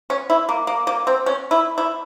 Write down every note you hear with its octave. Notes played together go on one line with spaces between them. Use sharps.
C#4
E4
A#3
A#3
A#3
C4
C#4
E4
E4